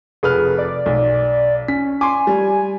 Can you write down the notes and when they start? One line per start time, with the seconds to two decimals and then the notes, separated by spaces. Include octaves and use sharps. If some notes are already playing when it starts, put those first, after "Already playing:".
0.23 F1 G#4 B4 F6
0.58 D5
0.86 B1
1.68 C#4 B6
2.01 G#5 C6 D6
2.27 G3